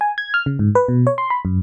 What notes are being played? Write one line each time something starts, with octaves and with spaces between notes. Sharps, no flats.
G#5
G#6
F6
C#3
G#2
B4
B2
C#5
C6
B5
F#2